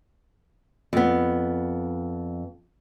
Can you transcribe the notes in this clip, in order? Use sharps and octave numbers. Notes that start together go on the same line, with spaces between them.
F2 B3